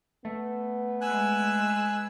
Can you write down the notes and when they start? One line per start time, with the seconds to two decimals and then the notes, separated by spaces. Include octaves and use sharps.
0.25 A3 B3
1.01 G#3 B4 G#5 E6 F#6